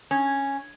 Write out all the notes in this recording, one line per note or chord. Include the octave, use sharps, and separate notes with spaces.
C#4